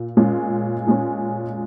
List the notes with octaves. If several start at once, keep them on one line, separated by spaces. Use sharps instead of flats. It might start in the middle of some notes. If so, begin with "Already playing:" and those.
Already playing: A#2
A#2 G#3 C#4
A#2 G#3 C#4